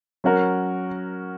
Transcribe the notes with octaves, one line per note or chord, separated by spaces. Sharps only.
F#3 C#4 F#4 A#4